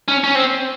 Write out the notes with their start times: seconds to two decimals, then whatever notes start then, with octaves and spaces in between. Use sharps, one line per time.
0.08 C#4
0.24 C#4
0.35 C4